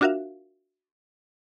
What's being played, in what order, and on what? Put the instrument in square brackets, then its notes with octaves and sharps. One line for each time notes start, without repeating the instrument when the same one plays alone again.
[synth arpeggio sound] D4 F4 F#4 A#4 E5 F5